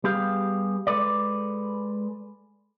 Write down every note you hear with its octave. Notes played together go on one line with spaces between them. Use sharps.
G3 B3 G4 G#4 F5
G#3 A4 B4 D5